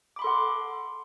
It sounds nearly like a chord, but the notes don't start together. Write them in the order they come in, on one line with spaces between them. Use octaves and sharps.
D6 B5 C6 A4 F#5